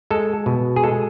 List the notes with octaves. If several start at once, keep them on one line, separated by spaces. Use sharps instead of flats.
G#3 A4
B2
G#4
G#3 A4